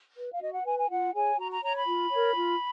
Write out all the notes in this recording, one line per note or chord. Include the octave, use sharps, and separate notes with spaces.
B4
F5
F#4 D#5
F#5
B4 G#5
G#5
F4 F#5
G#4 C#5 G#5
F#4 A#5
A#5
C#5 A#5
B5
F4
A#4 C#5
F4